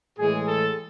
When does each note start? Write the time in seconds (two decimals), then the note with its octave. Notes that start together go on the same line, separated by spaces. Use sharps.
0.18 A2 E3 G#3 G#4
0.48 A4